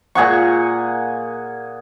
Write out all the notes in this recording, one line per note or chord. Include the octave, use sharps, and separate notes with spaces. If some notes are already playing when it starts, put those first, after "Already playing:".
A#2 G#4 F#5 C#6